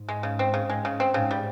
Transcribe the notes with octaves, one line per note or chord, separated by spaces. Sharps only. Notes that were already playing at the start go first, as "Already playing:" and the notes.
Already playing: G#2
G#3
C#3
C4
C#3
G#3
C#3
C4
G#2 C#3
G3